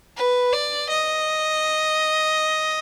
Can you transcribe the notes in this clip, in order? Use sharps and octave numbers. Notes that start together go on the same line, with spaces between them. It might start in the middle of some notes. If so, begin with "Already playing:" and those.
B4
D5
D#5